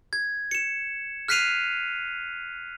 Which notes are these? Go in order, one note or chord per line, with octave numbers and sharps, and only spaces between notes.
G#6
C#7 E7
F6 F#6 B6 C7 D#7 F7